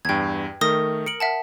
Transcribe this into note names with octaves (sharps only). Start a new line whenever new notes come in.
E2 G2 G5 G#6
D#3 A3 A#4 D#6 A#6
A#4 C#7 D7 F#7
E5 F#5 A5